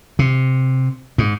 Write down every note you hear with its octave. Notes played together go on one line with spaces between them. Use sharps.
C3
G#2